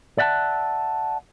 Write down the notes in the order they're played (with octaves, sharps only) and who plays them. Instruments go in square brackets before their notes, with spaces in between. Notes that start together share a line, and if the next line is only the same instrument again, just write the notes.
[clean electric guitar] D5 E5 F#5 G5 A5